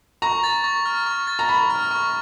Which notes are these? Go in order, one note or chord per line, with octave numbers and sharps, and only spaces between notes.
A#5 C#6
A6
C#6
F6
C#6
A6
A#5
B5 C#6
F6
C#6